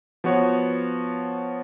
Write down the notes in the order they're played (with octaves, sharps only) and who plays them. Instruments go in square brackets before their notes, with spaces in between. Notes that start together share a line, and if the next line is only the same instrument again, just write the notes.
[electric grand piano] F3 B3 F#4 C#5